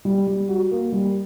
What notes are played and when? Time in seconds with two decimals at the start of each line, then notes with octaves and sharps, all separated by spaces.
0.05 G3
0.27 G3
0.48 F#4
0.71 A#3
0.92 G3